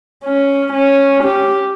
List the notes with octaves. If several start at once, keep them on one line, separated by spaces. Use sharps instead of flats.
C#4
C#4
G4